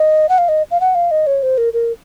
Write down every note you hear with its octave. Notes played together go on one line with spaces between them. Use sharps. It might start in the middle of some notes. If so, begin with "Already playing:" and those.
Already playing: D#5
F#5
F5
D#5
F5
F#5
F5
D#5
C#5
C5
A#4
A#4